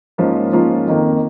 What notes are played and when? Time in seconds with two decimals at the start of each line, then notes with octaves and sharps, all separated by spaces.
0.18 G#2 F3 A#3 C#4 F4
0.53 G#2 F3 A#3 C#4 F4
0.87 F2 D#3 A#3